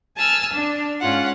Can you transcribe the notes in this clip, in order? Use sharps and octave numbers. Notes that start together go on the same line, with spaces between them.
G#5 A5 E6 F6
D4
G#2 C#4 F4 F#5